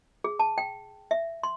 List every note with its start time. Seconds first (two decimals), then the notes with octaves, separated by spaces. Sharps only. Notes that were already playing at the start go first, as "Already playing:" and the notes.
0.24 G#4
0.39 A5
0.58 G5
1.11 E5
1.43 C6